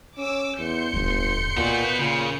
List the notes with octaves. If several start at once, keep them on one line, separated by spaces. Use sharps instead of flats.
C#4 D6 E6
E2 C6 G6 C#7
D1 G1 E2
D#2 A#2 B3 F#4
A#2 C#3